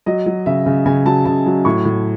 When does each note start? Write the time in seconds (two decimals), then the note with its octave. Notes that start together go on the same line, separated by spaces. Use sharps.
0.06 F#3 D#5
0.26 F#3
0.46 C#3 E5
0.66 C#3
0.86 C#3 G#5
1.05 F#3 A5
1.25 C#3 A5
1.46 F#3
1.65 A2 C#6
1.85 A2